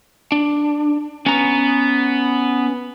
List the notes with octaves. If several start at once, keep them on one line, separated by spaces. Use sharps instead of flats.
D4
B3 C#4 A#5